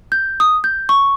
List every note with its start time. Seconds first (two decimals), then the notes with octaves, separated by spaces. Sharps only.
0.12 G6
0.40 D#6
0.64 G6
0.89 C#6